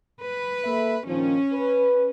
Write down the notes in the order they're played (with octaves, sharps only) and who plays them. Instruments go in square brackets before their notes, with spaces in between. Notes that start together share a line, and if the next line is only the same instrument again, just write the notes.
[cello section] B4
[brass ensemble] A#3 A4 E5
[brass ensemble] A#1 D#3 F3 [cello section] C#4
[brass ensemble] B4